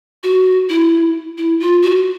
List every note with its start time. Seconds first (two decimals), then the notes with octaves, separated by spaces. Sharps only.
0.23 F#4
0.69 E4
1.38 E4
1.60 F4
1.82 F#4